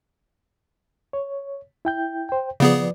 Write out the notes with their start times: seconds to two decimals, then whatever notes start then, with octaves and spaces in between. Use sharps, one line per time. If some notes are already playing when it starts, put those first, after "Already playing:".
1.13 C#5
1.85 E4 G5 G6
2.29 C5 G5
2.60 C#3 F3 B3 G#4 B4 D5